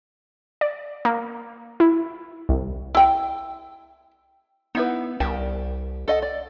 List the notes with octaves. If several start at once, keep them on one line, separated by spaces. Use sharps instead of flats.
D5
A#3
E4
C2
E4 G5
B3 D#4 E4 B4
C2 G4 A#4 A5
A4 D#5 F#5
D5